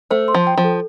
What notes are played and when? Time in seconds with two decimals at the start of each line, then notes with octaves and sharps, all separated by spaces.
0.11 A3 C5
0.28 C6
0.34 F3
0.47 G5
0.58 F3
0.64 A4